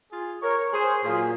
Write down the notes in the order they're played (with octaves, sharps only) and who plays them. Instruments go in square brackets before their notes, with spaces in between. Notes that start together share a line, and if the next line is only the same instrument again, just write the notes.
[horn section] F4 G#4
A#4 C#5
G#4 C5
A#2 F#3 F4 G#4